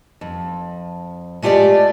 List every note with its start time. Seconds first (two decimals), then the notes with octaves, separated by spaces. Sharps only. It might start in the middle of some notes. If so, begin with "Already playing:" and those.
0.21 F2
1.42 G#3 A3 F4 G4 D5